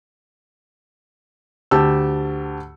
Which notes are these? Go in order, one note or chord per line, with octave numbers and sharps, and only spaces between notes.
D2 G4 A5 E6